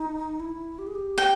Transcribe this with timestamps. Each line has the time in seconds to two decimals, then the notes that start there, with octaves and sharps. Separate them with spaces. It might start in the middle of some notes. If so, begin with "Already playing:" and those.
Already playing: D#4
0.40 E4
0.79 G4
0.87 G#4
0.95 G4
1.18 G5